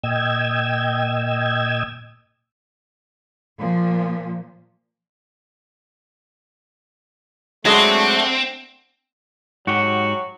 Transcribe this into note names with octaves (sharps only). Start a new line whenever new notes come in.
A#2 D#5 G5 E6 G#6
A#2 F3
F#3 G#3 A3 C4 D4 F#5
G#2 F#3 F#4 G4